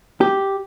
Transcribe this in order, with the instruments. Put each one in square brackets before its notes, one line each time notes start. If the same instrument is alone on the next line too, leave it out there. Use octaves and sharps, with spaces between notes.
[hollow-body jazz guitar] G4